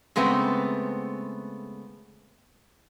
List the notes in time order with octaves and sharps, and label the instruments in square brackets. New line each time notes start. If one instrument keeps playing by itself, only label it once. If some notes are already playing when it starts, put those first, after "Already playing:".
[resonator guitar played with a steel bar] C#3 G#3 A3 B3 C4